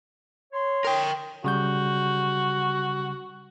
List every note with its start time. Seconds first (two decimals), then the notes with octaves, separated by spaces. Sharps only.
0.53 C#5 C6
0.85 A#4 G5
1.44 C#3 G3 F#4 G6